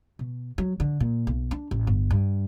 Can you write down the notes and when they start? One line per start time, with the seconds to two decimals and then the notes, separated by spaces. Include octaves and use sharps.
0.19 B2
0.58 F#3
0.80 D3
1.00 A#2
1.27 B1
1.51 D4
1.71 A1
1.87 G1
2.11 G2